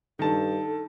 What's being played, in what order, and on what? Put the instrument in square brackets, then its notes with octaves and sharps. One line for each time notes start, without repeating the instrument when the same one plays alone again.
[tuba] G2 [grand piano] D#3 A5 [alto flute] A4